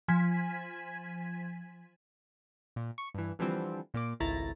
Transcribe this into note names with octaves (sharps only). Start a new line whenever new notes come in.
F3 G#5 G#6 B6
A#2
C#6
G2 E3
D3 E3 F3 G3 C4
A#2 A#3 D6
G#1 C#2 A3 E4 A#5 A6